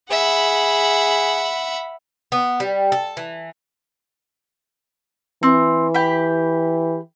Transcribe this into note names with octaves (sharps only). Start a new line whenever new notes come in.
G#4 E5 F#5 B5
B3
G3
A4
E3
E3 C4
G4 B5